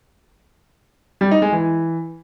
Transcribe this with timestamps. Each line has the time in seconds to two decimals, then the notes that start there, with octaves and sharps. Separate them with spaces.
1.21 G3
1.31 D#4
1.42 G#3
1.52 E3